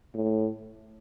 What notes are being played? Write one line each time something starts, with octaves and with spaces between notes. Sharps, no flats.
A2